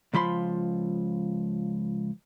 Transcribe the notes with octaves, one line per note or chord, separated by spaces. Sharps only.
C#2 F3 B5 C6